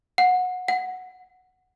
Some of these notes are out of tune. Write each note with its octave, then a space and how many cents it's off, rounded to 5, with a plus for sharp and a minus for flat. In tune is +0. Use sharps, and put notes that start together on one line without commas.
F#5 -20
F#5 -5